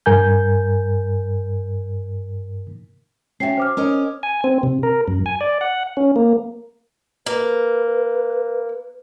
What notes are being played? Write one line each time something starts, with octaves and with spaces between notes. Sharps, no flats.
G2 A#4 G#5 G6
C#4 F#4 E5 G5 C7
C5 D6 F6
C#4 A#4 D#5
G#5
C4
C3
A#4
F#2
G#5
D5
F#5
C#4
A#3
A#3 B4